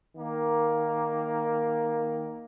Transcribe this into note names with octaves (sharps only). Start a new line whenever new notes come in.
D#3 A#3